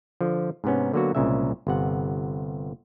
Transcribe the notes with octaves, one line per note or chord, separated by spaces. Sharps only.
D3 F3
G#2 C3 B3 C#4
D3 F#3 A#3 B3 F#4
C2 A#2 C#3 G#3 E5
G1 C3 F#5